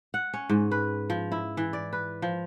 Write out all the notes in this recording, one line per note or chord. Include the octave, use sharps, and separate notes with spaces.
F#5
C#4
G#2
B4
F3
E4
E3
D5
B4
F3